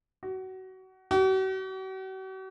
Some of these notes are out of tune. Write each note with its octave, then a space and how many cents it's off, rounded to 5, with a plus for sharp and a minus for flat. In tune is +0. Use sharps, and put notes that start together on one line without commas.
F#4 +25
F#4 +45